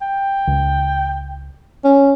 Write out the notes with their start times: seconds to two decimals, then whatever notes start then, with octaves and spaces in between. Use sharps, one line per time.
0.02 G5
0.47 C#2
1.84 C#4